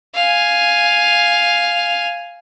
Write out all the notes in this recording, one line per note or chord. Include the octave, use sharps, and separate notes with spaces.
F5 G#5